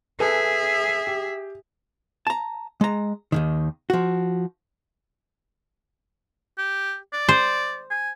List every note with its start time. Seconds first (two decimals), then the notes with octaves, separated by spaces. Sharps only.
0.20 G#4 A4 B4 E5 G#5
1.07 G4
2.27 A5 A#5
2.81 G#3 A#5
3.32 D#2 G#2 D#3
3.90 F3 F#4
6.58 G4
7.13 D5
7.29 C5
7.91 G#5